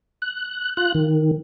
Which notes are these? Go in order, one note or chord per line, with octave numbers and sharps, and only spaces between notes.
F#6
F4 F#6
D#3